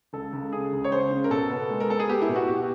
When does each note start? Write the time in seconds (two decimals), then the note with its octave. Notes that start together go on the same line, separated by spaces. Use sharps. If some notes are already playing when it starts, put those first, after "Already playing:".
0.13 C#2 A4
0.33 C#2
0.52 C#3 G#4
0.72 C#2
0.84 C#5
0.91 C#2 C5
1.11 C#3
1.24 A#4
1.30 B2 A4
1.51 B3
1.70 G#3
1.80 A#4
1.89 B3 A4
1.99 G#4
2.09 B3 G4
2.22 E4
2.29 B2
2.36 F#4
2.48 B2 G4